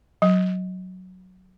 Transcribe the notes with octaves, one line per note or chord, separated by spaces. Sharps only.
F#3